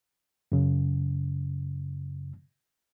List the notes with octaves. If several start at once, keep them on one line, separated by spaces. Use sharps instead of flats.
F#2 C#3